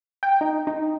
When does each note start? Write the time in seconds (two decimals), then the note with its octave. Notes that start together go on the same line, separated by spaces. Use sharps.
0.23 G5
0.41 D#4
0.67 D#4